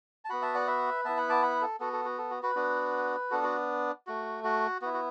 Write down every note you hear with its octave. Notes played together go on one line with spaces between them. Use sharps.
A5
B3 F#4 F#5 B5
E5 A5
D5 F#5
B4 E5
B3 E4 E5 A5
F#5 B5
A5 D6
F#5 B5
A4
B3 F#4 A4
A4
F#4
A4
F#4
F#4 B4
B3 D4 F#4
B3 D4 F#4 A4
F#4
A3 F#4
F#4
B3 E4 F#4
F#4